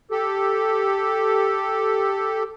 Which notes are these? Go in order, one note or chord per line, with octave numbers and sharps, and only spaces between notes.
G4 A4